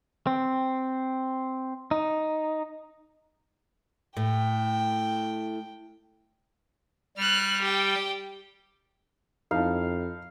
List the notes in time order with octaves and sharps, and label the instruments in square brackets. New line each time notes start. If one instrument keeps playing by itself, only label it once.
[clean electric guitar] C4
D#4
[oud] A2 [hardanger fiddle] G5
[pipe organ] G3 [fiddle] F6 F#6
[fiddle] G4 G5
[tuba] F2 [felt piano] D#4 E4 A5 [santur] F5